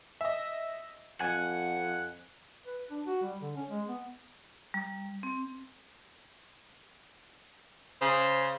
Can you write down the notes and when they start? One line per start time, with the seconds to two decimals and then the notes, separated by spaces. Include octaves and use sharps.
0.21 D#5 E5
1.20 F2 F#5 G#5
2.66 B4
2.90 D4
3.06 F#4
3.23 G3
3.42 D3
3.56 C#4
3.70 G#3
3.88 B3
4.74 G3
5.23 C4
8.01 C#3 C5